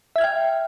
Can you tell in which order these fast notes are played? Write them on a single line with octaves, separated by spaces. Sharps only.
E5 G#6 F6 G5